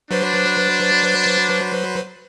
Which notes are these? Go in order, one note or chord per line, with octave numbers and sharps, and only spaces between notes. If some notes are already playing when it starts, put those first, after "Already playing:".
F#3 D4 B4 C5